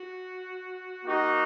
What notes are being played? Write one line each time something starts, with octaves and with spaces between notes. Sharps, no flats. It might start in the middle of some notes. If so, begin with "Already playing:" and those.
Already playing: F#4
A#3 D#4 F#4